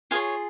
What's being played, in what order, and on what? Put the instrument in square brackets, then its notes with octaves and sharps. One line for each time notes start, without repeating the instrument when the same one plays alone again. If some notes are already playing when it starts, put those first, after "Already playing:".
[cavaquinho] F4 G#4 C#5 F5 G#5